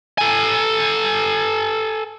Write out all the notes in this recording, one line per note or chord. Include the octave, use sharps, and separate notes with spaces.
A4 G#5